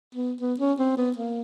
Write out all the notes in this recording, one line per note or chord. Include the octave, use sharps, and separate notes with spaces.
B3
B3
C#4
C4
B3
A#3